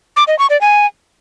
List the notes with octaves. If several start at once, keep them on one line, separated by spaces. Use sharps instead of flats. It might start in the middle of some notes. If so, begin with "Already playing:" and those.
D6
D#5
C#6
D5
G#5